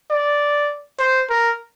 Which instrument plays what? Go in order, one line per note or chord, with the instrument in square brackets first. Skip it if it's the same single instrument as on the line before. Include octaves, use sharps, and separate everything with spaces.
[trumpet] D5
C5
A#4